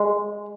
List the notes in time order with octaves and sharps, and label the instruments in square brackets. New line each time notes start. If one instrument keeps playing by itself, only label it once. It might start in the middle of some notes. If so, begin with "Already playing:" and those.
Already playing: [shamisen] G#3